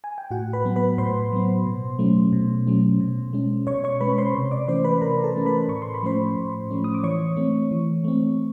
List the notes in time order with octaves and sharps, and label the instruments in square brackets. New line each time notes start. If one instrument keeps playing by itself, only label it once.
[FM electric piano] G#5
G5
A2 F#4 F#5
B4 B5
F#3 B3
B4 B5
A2 C5 C6
F#3 B3
B2
F#3 A3 C#4
B2
F#3 A3 C#4
B2
G#3 C#4
B2 C#5 C#6
C#5 C#6
G#3 C#4 B4 B5
C5 C6
C3
D5 D6
E3 A3 C#4 C5 C6
B4 B5
C3 A#4 A#5
A4 A5
E3 A3 C#4
B4 B5
A2 C#6
C6
B5
F3 A3 C#4 C5 C6
A2
F3 A3 C#4
D#6
D6
E3 C#5 C#6
A3 C4
E3
A3 C4